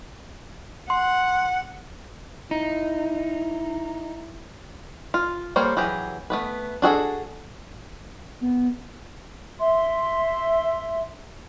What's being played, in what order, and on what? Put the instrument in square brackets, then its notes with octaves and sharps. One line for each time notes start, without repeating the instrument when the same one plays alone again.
[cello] F#5 [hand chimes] C6
[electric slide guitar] D#4 [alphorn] E4
[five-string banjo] F4
G3 A#3 A4 C5 C#5
E3 F#3 G4 G#4
A3 B3 B4
D4 F#4 G#4 A4
[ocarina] B3
[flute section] E5 C6